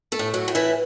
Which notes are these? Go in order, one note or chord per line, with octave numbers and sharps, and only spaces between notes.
A3 A4
A2
F#3 F#4
A2
E3 E4